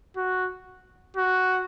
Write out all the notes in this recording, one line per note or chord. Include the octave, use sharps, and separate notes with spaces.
F#4
F#4